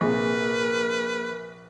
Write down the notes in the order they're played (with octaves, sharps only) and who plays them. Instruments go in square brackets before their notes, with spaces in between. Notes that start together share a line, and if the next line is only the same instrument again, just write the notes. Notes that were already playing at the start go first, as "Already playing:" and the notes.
[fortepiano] A#1 C3 [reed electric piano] A#3 G#4 [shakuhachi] A#4 [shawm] B4